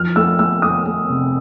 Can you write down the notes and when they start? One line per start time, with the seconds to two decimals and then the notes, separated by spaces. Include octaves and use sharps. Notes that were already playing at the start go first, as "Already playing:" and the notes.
Already playing: F3 F6
0.16 A3 E6
0.39 A3 E6
0.62 A3 D#6
0.86 A3
1.09 C3